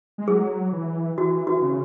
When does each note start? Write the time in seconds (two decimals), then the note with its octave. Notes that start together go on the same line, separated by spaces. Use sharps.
0.18 G#3
0.28 F#3 G#4
0.73 E3
1.18 E3 F#4
1.47 F#4
1.56 E3
1.62 C#3